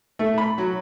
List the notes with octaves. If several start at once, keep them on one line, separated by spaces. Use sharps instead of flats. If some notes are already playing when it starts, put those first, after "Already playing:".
A3
B5
F#3